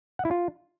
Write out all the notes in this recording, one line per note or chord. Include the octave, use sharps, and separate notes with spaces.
F#5
E4
F4